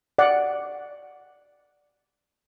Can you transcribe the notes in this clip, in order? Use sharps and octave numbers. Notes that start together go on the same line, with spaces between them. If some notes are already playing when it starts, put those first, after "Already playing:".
D5 F#5